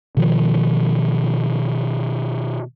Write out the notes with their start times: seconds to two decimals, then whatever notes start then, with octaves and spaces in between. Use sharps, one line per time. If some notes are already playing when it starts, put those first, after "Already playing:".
0.17 B2 D#3 F3